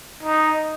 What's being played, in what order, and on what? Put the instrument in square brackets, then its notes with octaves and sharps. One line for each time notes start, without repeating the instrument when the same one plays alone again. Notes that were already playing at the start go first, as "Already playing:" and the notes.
[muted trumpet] D#4